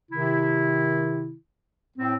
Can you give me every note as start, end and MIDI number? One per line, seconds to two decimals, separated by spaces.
0.12 1.34 48
0.12 1.34 51
0.12 1.34 64
1.97 2.16 45
1.97 2.16 60